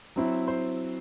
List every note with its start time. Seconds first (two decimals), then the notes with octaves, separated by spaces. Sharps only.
0.16 F#3 C4 E4
0.48 C5